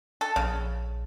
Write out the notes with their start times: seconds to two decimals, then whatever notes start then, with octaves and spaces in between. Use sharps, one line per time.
0.21 A4
0.36 A#1 C#3